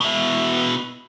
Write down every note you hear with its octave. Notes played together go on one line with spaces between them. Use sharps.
B2 E4